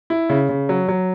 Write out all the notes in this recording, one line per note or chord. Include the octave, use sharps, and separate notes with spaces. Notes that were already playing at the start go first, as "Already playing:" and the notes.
E4
C#3
C#3
F#3
F#3